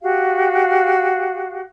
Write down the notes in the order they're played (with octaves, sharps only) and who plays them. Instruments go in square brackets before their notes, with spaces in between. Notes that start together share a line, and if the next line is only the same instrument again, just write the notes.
[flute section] F#4 G4 F5